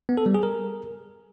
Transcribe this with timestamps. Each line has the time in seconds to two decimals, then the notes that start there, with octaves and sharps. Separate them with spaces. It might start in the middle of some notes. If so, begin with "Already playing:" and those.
0.09 B3
0.17 A4
0.26 G3
0.34 G#4
0.43 A#4